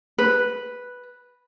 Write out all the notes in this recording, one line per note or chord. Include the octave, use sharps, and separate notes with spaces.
B4